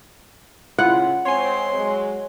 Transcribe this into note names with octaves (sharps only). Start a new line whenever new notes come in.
A#2 C#3 E4 F4 F#5
G#3 C4 C#5 G#5 C6
F#3 G#3